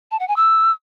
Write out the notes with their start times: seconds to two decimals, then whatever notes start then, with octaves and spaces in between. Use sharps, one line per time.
0.11 A5
0.20 F#5
0.28 G#5
0.36 E6